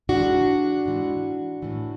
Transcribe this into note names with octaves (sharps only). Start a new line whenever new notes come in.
G#2 E3 D4 F#4
G#2 E3
A2 E3